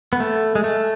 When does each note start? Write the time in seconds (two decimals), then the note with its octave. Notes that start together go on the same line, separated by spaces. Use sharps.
0.13 B3
0.20 A3
0.55 G#3
0.64 A3